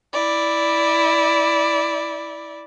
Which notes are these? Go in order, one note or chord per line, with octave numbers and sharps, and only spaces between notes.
E4 D5